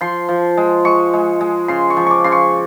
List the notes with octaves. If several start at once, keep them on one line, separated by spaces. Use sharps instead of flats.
F3 C6
F3
G#3
G#3 C#6
G#3
G#3
C#3 C6
C#6
F3
C#6 D6
C#3 C6
C#6